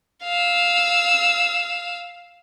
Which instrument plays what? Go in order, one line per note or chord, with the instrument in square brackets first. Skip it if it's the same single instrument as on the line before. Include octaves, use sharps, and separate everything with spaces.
[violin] F5 E6